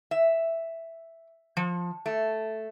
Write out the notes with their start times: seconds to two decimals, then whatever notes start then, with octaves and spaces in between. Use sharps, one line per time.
0.11 E5
1.57 F3
2.06 A3